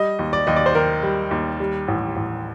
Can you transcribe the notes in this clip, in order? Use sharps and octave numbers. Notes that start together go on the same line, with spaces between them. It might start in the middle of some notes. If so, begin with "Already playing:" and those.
Already playing: G3 D#5
D#2
D5
D#2 D#5
D5
C5
D#3 A#4
G3
D#2
G3
A1
A1